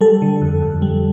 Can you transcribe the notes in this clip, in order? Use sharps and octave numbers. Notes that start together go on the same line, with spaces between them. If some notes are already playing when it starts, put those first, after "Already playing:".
G3 A4
D3
F2
F2
G3